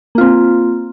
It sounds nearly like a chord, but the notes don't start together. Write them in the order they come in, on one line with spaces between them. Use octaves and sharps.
A#3 F4 C4